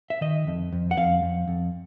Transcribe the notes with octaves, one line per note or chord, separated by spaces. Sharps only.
E5
D#3 D#5
F2
F2
F#5
F2 F5
F2
F2